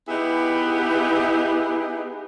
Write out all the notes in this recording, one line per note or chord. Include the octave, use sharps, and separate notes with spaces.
B3 D#4 E4 G4 G#4